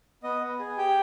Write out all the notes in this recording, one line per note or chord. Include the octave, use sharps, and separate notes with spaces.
B3 D#5
B3
G#4
G4 G5